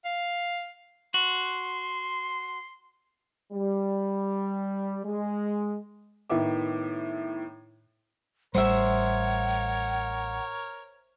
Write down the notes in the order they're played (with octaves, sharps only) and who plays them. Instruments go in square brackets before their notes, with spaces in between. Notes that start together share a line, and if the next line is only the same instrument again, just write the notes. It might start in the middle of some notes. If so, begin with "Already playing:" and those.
[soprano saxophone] F5
[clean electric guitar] F#4 [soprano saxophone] C6
[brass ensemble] G3
G#3
[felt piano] A2 D#3 B3 E5 D6
[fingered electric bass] A1 G3 [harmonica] A#4 C#5 [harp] C5 E5 [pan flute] F#5